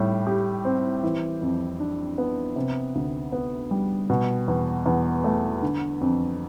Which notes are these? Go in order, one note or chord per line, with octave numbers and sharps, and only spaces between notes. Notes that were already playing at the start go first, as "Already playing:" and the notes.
Already playing: A2 G3
G4
C4
E3
F2
D4
B3
C3
D2
B3
G3
B2
E2
E2
A3
D3
F2